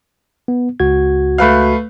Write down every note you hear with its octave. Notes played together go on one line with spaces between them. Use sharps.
B3
C#2 F#4 G#6
A3 B4 F5